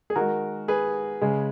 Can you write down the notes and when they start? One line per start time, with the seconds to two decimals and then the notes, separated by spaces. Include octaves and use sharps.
0.10 G#4
0.16 D#3 G#3 F#4 A#4
0.68 G#4 B4
1.21 C#3 G#3